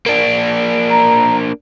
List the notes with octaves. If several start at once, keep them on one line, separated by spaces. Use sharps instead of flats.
A#3 D4
A#5